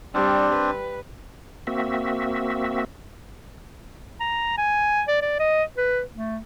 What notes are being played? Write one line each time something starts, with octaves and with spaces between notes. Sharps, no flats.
G3 C4 D4
B4
A#3 C4 F#4 E5
A#5
G#5
D5
D5
D#5
B4
A3